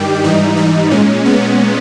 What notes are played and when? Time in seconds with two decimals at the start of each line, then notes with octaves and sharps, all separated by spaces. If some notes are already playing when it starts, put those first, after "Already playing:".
Already playing: G2 D#3 G3 G4
0.24 G#2 E3 G3 D#4
0.57 D#4
0.91 A#2 G#3 C#4
1.25 B3